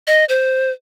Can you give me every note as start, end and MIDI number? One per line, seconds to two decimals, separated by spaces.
0.07 0.25 75
0.29 0.71 72